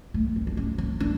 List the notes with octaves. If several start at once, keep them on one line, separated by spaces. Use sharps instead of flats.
A3
C4
D4
C#4
C#4
D4